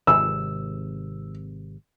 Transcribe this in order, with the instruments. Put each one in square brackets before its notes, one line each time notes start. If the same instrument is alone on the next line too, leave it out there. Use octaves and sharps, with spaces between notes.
[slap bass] G#1 C3 [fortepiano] E6